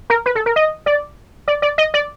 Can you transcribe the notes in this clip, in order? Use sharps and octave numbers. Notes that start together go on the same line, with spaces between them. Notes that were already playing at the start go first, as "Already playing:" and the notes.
A#4
B4
A4
A#4
D#5
D5
D5
D5
D#5
D5